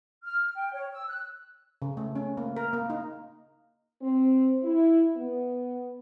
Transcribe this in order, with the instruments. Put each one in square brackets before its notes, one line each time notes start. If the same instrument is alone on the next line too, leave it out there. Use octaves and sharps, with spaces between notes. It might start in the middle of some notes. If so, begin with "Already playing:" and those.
[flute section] F6
G5
C#5
E6
F#6
[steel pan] C#3
A3
C#4
A#3
A#4
A#3
D#4
[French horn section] C4
E4
B3